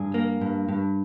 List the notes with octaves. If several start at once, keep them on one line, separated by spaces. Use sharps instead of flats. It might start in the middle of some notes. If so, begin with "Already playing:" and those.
Already playing: G2 G#4
A#3
G2
G2